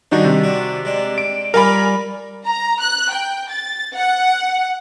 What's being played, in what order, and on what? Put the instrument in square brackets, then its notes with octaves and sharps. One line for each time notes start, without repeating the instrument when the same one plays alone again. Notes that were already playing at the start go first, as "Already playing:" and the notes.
[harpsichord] D#3 G3 G#4 [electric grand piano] D4 D#4 F#4
[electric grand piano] C3
[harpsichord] D4 F#4
G#3 D4
[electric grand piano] D7
[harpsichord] G3 F4 D5 [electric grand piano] A#4 G#5 B5
[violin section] A#5
F#6
G5
A6
F#5